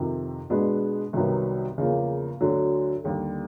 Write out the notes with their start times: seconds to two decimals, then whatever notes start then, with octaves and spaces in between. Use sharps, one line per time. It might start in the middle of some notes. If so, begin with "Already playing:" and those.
Already playing: F2 C3 D#3
0.50 B2 G#3 B3 D4
1.13 C2 C3 D#3 F#3 B3
1.78 E2 C#3 F3 A#3
2.41 D2 D3 F#3
3.04 D#2 D3 G3